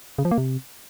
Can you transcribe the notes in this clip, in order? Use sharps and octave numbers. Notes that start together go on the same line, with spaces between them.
C#3
F3
A#3
C3